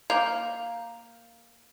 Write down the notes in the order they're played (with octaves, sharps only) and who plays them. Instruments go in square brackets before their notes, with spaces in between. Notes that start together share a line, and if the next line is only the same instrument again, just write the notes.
[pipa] A#3 [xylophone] F5 G6 F7